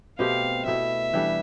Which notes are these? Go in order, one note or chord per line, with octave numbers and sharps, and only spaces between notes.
B2 A3 C4 G4 F5
B2 A3 E4 E5
E3 G3 D4 A4